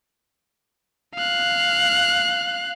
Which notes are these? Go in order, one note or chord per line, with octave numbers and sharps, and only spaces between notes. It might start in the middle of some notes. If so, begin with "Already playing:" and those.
F5 F#6